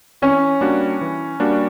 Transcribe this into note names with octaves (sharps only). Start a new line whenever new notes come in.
E3 C#4
G3 A#3 D4 F#4
E3
G3 A#3 D4 F#4